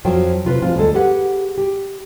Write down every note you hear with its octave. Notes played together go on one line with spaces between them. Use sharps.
F2 F3 F#3 G5
C3 F4 B4
F3 G#3 C4 F4
D2 G#3 A4
G4 G#4 B4 F#5
G4